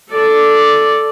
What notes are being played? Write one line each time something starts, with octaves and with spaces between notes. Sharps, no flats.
A4 D5